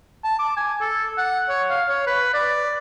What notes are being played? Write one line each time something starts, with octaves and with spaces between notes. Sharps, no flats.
A5
D6
G#5
A4
F#5
C#5
F5
C#5
B4
D5